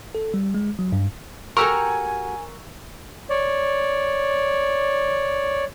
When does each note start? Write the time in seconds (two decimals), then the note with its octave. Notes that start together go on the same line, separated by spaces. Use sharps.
0.15 A4
0.34 G3
0.54 G#3
0.79 F#3
0.92 G2
1.57 F#4 G4 A4 A#4 G#5 A#5 C#6 E6
3.30 C#5 D5